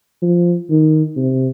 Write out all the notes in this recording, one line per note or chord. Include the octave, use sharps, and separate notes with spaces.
F3
D#3
C3